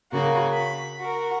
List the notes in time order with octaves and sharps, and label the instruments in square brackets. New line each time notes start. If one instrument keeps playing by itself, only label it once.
[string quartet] C#3 A#3 F#4
B5
F#4 A#4